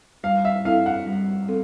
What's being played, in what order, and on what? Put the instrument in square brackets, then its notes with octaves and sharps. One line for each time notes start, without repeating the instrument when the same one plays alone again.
[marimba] G3 [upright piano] F5
[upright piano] E5
[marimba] C4 E4 A4 [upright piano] F5
[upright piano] F#5
[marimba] G3
C4 A4